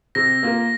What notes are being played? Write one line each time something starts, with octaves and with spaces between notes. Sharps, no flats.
C3 A#6
A#3 F4 A#4